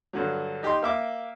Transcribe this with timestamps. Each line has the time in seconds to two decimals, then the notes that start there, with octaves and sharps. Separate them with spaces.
0.13 G2 D3 F#3
0.63 D#4 G4 G5 C6
0.82 A#3 E5 D6